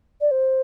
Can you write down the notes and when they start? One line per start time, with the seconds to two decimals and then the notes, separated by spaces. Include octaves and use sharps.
0.21 D5
0.31 C5